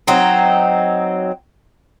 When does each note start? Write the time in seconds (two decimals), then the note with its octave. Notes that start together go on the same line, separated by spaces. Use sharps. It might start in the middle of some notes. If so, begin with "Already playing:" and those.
0.07 F#3 C4 D#4